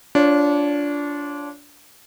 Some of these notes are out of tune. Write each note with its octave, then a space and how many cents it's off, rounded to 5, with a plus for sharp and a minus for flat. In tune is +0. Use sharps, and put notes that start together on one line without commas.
D4 -20 F4 +0 C#5 +0